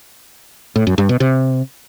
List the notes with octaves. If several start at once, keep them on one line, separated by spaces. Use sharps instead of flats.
A2
F#2
G2
B2
C3